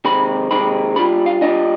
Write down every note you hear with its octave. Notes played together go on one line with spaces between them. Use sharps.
C3 D#3 G#3 C4 D#4 B5
C3 D#3 G#3 C4 D#4 B5
G3 D4 F4 B5
F5
G3 D4 F4 D#5